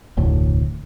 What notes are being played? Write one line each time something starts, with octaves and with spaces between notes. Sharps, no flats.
F1 D2 A2 D3